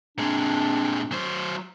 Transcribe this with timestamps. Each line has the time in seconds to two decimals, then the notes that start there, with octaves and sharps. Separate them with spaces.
0.18 A#2 G#3 C4 D4
1.12 F#3 C5